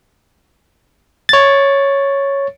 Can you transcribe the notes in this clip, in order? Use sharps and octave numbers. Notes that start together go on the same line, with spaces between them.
C#5 A6